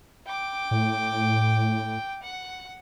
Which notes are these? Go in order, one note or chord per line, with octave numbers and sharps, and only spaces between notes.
G5 D6
A2
F#5